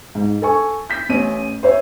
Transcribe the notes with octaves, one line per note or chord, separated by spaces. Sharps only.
G#2
A4 G#5 C#6
G6 B6
A1 C#4 D#7
C5 C#5 E5